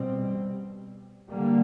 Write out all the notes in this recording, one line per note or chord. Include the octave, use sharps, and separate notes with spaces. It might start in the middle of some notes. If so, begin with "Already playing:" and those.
Already playing: B2 G3 C4
D3 G3 A#3